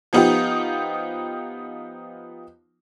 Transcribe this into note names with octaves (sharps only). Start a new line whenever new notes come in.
F3 B3 D#4 F4 G4